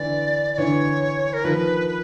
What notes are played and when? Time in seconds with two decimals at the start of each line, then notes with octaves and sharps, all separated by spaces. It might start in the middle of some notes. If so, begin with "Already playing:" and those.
Already playing: D3 E3 D5
0.54 D5
0.58 D3 E3 C#5
1.33 A#4
1.44 D#3 F3 B4
1.88 B4